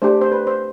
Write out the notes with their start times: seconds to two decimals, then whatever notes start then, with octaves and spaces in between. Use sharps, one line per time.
0.02 A3 D4 G4 C5
0.21 C5
0.32 B4
0.47 C5